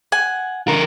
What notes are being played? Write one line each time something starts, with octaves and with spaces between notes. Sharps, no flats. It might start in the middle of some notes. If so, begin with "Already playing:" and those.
F#5 G#5
D3 A#4